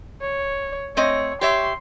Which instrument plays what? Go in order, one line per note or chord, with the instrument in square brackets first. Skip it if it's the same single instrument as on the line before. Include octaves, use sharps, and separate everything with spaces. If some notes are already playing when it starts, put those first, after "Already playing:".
[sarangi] C#5
[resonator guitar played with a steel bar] A3 C4 D#5 [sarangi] C#5
[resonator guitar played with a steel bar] G4 C#5 E5 [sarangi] C6